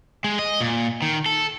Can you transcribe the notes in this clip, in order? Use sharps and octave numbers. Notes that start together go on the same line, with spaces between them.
G#3
D#5
A#2
D#3
A4